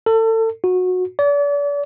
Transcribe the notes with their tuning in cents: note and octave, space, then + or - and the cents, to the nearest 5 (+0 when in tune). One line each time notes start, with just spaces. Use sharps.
A4 +30
F#4 -20
D5 -40